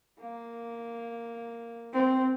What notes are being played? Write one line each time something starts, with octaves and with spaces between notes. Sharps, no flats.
A#3
C4